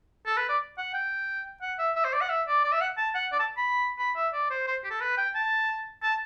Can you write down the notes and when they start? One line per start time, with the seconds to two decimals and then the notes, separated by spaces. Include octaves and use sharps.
0.26 A4
0.37 B4
0.49 D5
0.78 F#5
0.94 G5
1.62 F#5
1.78 E5
1.96 E5
2.05 C5
2.13 D5
2.21 F#5
2.30 E5
2.47 D5
2.64 D5
2.72 E5
2.81 F#5
2.97 A5
3.15 F#5
3.32 D5
3.39 A5
3.57 B5
3.99 B5
4.16 E5
4.33 D5
4.51 C5
4.67 C5
4.84 G4
4.90 A4
5.01 B4
5.17 G5
5.35 A5
6.03 A5